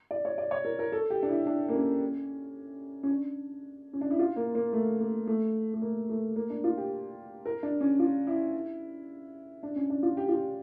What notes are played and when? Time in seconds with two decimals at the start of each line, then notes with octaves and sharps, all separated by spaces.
0.11 D5
0.25 C#5
0.38 D5
0.51 C#5
0.65 A#4
0.79 A#4
0.92 A4
1.10 G4
1.23 D4
1.29 E4
1.46 D4
1.69 A#3
1.74 C#4
3.03 C#4
3.10 D4
3.93 C#4
4.01 D4
4.10 E4
4.19 F4
4.36 A#3
4.55 A#3
4.73 A3
5.00 A#3
5.27 A3
5.74 A3
5.82 A#3
6.10 A3
6.36 A#3
6.50 D4
6.64 F4
6.78 G4
7.46 A#4
7.63 D4
7.81 C#4
7.99 F4
8.27 E4
9.63 D4
9.76 C#4
9.90 D4
10.03 F4
10.17 G4
10.29 F4
10.35 G4